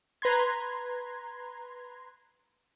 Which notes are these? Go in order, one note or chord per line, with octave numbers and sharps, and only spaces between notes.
B4 A#5 C6 G#6